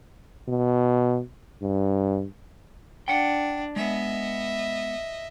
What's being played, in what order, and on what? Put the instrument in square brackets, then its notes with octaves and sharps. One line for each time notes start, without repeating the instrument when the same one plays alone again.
[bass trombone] B2
G2
[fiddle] D4 [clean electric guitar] F#5 G5
[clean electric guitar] G#3 B3 [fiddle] D#5 E5